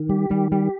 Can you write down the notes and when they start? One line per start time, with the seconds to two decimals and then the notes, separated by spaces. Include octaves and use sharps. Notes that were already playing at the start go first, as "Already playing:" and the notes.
Already playing: D#3
0.09 G3 G4
0.30 D#3 G3
0.52 G3 G4